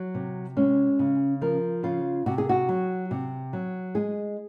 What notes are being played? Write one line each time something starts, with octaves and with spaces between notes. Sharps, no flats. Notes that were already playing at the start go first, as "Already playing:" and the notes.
Already playing: F#3
C3
G#3 C#4
C#3
F3 A#4
C#3 F4
C3 F#4
G#4
F#4
F#3
C3
F#3
G#3 G#4